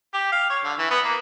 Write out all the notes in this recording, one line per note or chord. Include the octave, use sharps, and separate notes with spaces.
G4
F5
C#5
D3
E3
B3
A#3